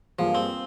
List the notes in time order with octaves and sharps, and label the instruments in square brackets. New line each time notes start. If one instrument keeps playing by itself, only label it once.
[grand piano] G2 G3 A#3 F4 G#4 [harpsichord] F3
[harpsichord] C4